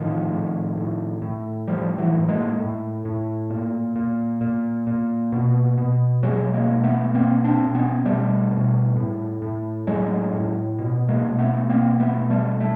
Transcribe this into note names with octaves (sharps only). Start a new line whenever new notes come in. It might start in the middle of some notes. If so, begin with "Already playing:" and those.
Already playing: A2 D#3 F3
A2
A2
A2
A2 F3 G3
E3 F#3
A2
G#3 A#3
A2
A2
A#2
A#2
A#2
A#2
B2
B2
B2 F#3 G#3
G#3 A#3
B2
A3 B3
B2 A#3 C4
C4 D4
B2
B3 C#4
B2 G3 A3
B2
A2
A2
A2 F#3 G#3
A2
B2
G#3 A#3
B2
A3 B3
B2 A#3 C4
A3 B3
B2
G3 A3
A3